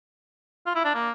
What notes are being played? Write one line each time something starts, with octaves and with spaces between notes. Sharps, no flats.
F4
E4
D4
A#3